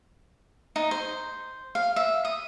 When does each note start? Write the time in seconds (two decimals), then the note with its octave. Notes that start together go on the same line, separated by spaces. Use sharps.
0.76 D#4
0.91 C5
1.75 F5
1.96 E5
2.25 D#6